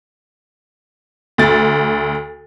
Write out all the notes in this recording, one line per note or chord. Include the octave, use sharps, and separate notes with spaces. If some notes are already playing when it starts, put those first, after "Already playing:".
D2 A6